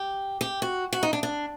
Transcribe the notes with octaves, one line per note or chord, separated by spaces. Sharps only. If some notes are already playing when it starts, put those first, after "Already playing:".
Already playing: G4
G4
F#4
F#4
D#4
D4
D4